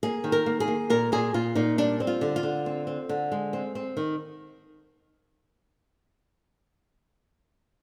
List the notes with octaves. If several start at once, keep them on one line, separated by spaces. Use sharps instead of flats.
A#3 G#4
D#3
A#4
A#3
G#4
A#3
A#2 A#4
A#2 G#4
A#2 F4
A#2 D#4
G3 D4
C4
F4
D3
F4
D3
C4
C4
D3
G#3
C4
C4
D#3